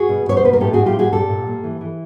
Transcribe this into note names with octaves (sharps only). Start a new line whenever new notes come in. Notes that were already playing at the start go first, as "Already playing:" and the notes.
Already playing: F#4 G#4
B2
B2 C#5
C5
A#3 B4
A#4
A2 G4 A4
A2 F#4 G#4
F4 G4
A#3 F#4 G#4
A#2 G4 A4
A#2
A#3
E3
E3